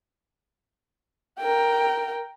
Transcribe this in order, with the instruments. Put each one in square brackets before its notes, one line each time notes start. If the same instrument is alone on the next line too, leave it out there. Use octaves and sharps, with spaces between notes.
[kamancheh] A#4 G5